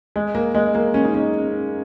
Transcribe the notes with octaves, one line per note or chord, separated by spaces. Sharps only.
G#3
A#3
G#3
A#3
C#4
D#4
C#4